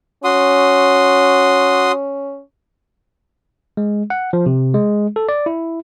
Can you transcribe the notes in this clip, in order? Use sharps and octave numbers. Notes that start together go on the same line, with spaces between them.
C#4 F#4 C6 D#6
G#3
F#5
F3
C3
G#3
A4
D5
E4